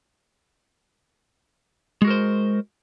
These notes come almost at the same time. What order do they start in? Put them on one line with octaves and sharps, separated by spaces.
G#3 F#4 A#4 C5